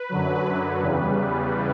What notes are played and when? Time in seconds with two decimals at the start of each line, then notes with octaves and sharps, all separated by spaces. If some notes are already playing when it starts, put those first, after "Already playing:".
Already playing: B4
0.09 F#2 D3 F#3
0.81 E2 C#3 G3